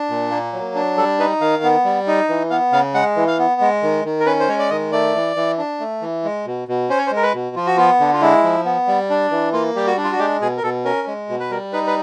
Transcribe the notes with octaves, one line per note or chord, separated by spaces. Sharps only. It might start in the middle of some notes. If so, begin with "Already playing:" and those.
Already playing: D4
A#2
A#3
F#3
D4
G3 A4
D#4 B4
D#3 F5
B3
G3
D#4
E3
B3 F5
C#3 F5
G#3 F#5
E3
F5
B3
G#3
D#3
D#3
A#4
C#4 B4
C5
G#3 C#5
D5
D#3 D#5
A3 D5
E3
E3
D4
A3
E3
G#3
B2
B2
C#4 C5
C#5
C5
G#3
A#4
B4
B2
F3 F4
F#4
B3 F4
D3
F4
G#3 E4
F3
B3
G3
D4
E3
A#3 F4
G3 G4
F#4
D4
F4
F#4
G#3 G4
B2 G#4
A#4
B2 A4
C#4 A#4
G#3
B2
B4
G3 A#4
D#4 B4
B4